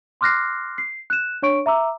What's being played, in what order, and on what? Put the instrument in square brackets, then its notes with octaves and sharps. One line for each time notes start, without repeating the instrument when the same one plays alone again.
[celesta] C6 D6 F6 F#6 A#6 C7
C7
F#6 E7
D4 C#5 C#6 D7
E5 A#5 D6 E6